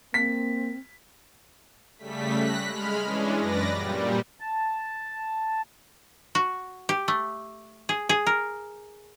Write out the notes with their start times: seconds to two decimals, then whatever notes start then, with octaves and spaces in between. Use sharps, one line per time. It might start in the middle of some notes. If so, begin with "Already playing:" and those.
0.14 A#3 C4 B6
1.98 C#3 G3 A3 B6
2.37 F#6 A#6 B6
2.68 G#3 B5 F6
3.03 E3 G#3 C#4 D4
3.35 F#2 B4 D5 A#6
3.72 A#2 G3
4.40 A5
6.35 F#4
6.89 G4
7.08 A3
7.89 G#4
8.09 G#4
8.26 A#4